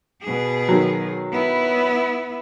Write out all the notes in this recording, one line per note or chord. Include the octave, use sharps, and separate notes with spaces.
B2 G#4
D#3 F#3
B3 E4